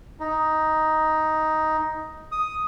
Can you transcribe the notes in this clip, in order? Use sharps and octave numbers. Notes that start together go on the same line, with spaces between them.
D#4
D#6